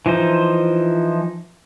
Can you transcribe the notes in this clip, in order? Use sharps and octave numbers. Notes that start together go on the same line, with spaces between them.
E3 F3 D#4 C5